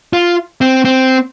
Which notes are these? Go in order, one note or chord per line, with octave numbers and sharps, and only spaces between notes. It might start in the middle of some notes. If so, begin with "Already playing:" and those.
F4
C4
C4